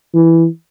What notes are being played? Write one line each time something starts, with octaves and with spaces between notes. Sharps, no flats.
E3